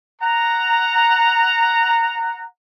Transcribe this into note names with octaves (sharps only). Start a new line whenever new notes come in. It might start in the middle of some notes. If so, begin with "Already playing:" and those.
F#5 A#5